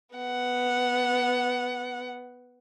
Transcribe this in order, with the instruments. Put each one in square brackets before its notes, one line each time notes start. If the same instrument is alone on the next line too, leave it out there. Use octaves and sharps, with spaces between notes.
[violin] B3 F#5